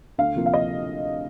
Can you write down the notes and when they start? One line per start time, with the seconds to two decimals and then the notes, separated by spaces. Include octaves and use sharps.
0.18 D2 F5
0.36 C3 F3 A#3
0.46 F5
0.54 D#5